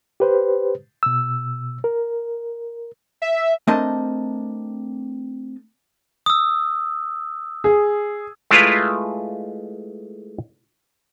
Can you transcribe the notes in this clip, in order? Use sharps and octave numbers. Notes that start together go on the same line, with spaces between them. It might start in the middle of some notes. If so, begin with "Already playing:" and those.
G4 B4 C5
B2 E6
A#4
E5
A3 C4 D4 A#4 D#5 A5
D#6 E6
G#4
G#3 A3 E4 F4 B4 F5